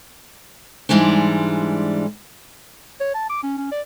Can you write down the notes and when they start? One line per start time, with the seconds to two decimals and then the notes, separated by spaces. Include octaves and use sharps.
0.89 G#2 E3 G3 G#3 D4
3.00 C#5
3.14 A5
3.30 D6
3.43 C#4
3.58 C#4
3.72 D5